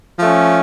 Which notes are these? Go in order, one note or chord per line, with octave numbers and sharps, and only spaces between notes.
F3 A3 C#4